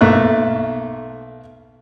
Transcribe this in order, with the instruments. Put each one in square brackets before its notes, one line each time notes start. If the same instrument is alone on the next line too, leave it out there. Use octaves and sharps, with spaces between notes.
[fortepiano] B1 A3 A#3 F#6